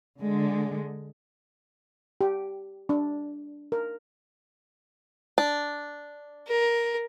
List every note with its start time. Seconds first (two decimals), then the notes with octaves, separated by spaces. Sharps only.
0.21 D3 G#3
2.21 G4
2.89 D4
3.72 A#4
5.38 D4
6.47 A#4